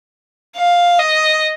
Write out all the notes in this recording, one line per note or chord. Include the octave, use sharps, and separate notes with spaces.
F5
D#5